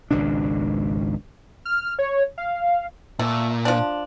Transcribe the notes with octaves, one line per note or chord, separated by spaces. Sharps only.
G#1 C#2 B2 D4
F6
C#5
F5
A#2 A3
F3 D4